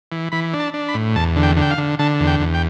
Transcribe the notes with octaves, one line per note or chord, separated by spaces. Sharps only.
E3
E3 B5
D4
A5
D4
B5
A2
E2 A5
D3
G5
D3 G5
F5
D3
D3 A5
E2
G5
E2
G5